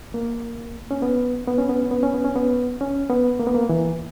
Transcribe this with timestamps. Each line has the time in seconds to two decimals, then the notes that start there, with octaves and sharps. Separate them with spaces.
0.14 A#3
0.91 C#4
1.02 B3
1.48 B3
1.58 C#4
1.69 B3
1.81 C#4
1.91 B3
2.03 C#4
2.14 B3
2.25 C#4
2.36 B3
2.81 C#4
3.10 B3
3.40 A#3
3.47 B3
3.55 A#3
3.69 E3